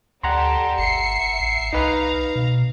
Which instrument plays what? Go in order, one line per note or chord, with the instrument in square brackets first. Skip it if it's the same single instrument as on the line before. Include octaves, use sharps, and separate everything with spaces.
[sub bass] D2 [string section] G3 G4 A4 [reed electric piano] F#5 A#5 C6
[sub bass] G1 [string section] E5 C7 C#7
[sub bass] A1
[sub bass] C2 [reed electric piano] D#4 B4 [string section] F5 A#5
[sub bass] B2